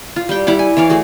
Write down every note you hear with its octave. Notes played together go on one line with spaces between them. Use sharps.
F4
G3 G5
G3 E4 F#5 D6
G#5
E3 C#5 D5 F5
A3 F#4 G#4